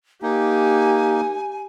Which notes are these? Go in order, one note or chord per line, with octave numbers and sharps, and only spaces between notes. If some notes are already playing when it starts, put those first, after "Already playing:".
A#3 D#4 G4 G#5